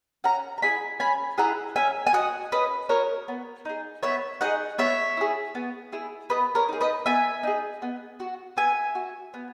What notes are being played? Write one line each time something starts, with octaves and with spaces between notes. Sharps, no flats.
C#4 F#5 A#5
A#5
E4 G#4 G#5 B5
C#4 G#5 B5
E4 G#4 F#5 A#5
C#4 E5 G#5
G#5
F#4 D#5 F#5
C#4 B4 D#5
F#4 A#4 C#5
B3
D#4 G#4
B3 C#5 E5
D#4 G#4 D#5 F#5
B3 C#5 E5
E4 G#4
B3
E4 G#4
B3 B4 D#5
A#4 C#5
D#4 G#4
B4 D#5
B3 E5 G#5
D#4 G#4
B3
F#4
B3 E5 G#5
F#4
B3